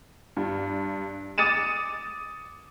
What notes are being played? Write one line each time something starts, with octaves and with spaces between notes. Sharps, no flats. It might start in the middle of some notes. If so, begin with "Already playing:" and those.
G2
D6 D#6 A6 C#7 D#7 E7